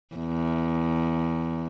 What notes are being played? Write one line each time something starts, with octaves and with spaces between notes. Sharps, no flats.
E2